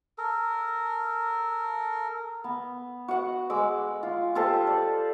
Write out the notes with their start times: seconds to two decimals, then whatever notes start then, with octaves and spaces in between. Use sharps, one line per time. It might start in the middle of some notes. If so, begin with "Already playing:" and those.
0.18 A4 A#4
2.44 B3
3.08 F#4 F#5
3.50 G#3 D6 E6
4.03 F4
4.35 F4 G4 A4 C5
4.67 D5